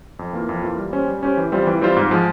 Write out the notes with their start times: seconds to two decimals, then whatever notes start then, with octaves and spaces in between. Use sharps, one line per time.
0.19 F2
0.33 E3 A#3 F4
0.49 F2
0.63 E3 A#3 F4
0.78 G3
0.93 C#4 G4 C5
1.08 G3
1.23 C#4 G4 C5
1.37 E3
1.52 G3 C4 F4 C5
1.67 E3
1.81 G3 C4 F4 C5
1.96 G#2
2.11 F3 G#3